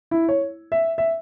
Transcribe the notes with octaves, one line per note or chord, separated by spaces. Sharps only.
E4
C#5
E5
E5